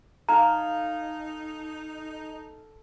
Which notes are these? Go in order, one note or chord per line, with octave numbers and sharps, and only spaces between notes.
D#4 A4 F5 G#5 A#5